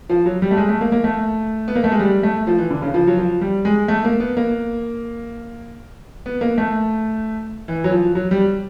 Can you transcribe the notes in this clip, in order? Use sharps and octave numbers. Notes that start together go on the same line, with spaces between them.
F3
F#3
G3
A3
G#3
A3
A#3
A#3
A3
B3
A#3
A3
G#3
G3
A3
F3
E3
D3
C#3
F3
F#3
F3
G3
G#3
A3
A#3
B3
A#3
B3
A#3
A3
E3
F#3
F3
F#3
G3